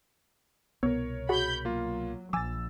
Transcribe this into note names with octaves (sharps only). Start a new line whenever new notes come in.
C2 B2 B3 A#4 C#5
F#4 G#4 F#5 B5 G6
F#3 A#3 F4
A#1 F3 G#5 D6 E6 A6